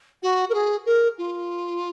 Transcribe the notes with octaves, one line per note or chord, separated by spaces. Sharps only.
F#4
A#4
G#4
A#4
F4